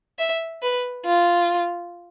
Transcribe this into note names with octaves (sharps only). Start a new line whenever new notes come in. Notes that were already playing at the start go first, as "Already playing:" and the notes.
E5
B4
F4